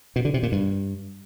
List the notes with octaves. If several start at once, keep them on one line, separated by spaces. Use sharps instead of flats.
B2
D3
C3
A#2
G2